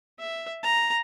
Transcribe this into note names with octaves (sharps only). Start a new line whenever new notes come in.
E5
A#5